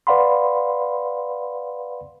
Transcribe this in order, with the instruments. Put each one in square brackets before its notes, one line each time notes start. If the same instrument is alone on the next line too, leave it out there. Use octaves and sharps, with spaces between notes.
[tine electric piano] B4 D5 F5 F#5 B5 C6